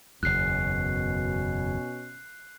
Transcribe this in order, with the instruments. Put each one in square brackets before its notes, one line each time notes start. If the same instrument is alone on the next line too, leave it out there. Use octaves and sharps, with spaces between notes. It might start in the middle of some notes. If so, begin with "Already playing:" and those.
[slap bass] F#1 E2 [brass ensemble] B2 C#4 [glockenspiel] F#6 C7